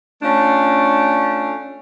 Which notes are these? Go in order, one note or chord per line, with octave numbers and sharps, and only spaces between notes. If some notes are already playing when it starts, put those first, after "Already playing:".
A3 C#4 D4 F4